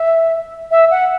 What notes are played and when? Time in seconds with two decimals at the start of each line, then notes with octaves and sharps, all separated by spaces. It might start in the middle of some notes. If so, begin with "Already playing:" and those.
Already playing: E5
0.71 E5
0.91 F#5